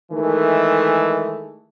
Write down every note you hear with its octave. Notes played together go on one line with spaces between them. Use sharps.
D#3 E3 G#3 A3